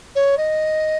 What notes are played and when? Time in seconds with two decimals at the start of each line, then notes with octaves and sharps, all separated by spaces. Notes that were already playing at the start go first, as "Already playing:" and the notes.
0.15 C#5
0.37 D#5